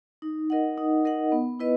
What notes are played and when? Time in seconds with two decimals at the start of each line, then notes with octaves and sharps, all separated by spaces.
0.22 D#4
0.50 A#4 D#5 F#5
0.78 D#4
1.05 A#4 D#5 F#5
1.32 B3
1.60 E4 B4 D#5